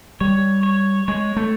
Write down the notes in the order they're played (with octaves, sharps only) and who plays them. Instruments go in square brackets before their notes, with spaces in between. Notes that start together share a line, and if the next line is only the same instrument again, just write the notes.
[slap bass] G3 [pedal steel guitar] C#5
[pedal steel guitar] C#5
[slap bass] G#3 [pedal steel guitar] C#5
[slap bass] A3